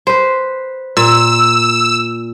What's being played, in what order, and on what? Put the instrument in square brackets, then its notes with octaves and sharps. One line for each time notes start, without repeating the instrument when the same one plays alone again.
[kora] B4 C5
[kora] A#2 [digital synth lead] E6